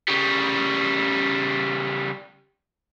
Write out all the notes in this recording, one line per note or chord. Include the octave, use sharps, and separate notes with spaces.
C#3 G3